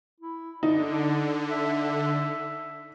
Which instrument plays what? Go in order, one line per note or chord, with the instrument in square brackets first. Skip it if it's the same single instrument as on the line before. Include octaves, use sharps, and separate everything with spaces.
[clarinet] E4
[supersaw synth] D3 [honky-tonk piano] D#4 [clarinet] D5
[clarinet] E5